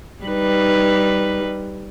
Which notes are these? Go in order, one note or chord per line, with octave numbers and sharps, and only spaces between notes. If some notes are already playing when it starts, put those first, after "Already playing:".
G3 D#4 B4